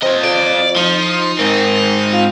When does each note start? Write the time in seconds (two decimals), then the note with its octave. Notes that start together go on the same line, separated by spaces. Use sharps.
0.03 C4 F4 D#5
0.24 F2 D5
0.77 F3 D#4
1.39 G#2 D#3 C4
2.13 F4